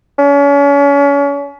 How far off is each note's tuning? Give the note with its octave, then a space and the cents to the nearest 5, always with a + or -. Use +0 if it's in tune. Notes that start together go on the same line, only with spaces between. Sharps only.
C#4 +35